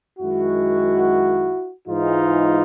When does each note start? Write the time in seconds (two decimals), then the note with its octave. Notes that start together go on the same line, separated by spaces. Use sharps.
0.19 F#2 D#3 G#3 E4 F#4
1.87 G#2 E3 G#3 D#4 F4